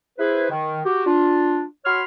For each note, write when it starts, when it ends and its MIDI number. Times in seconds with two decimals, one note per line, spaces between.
0.18 0.49 64
0.18 0.49 68
0.18 0.49 71
0.18 0.49 72
0.50 0.80 51
0.85 1.03 66
0.85 1.03 67
1.06 1.63 62
1.06 1.63 65
1.85 2.03 66
1.85 2.03 73
1.85 2.03 83
1.85 2.03 84
1.85 2.03 89